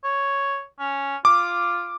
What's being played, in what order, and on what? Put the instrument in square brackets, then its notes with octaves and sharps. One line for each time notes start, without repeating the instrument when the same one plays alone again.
[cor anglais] C#5
C#4
[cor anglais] F4 [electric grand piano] D6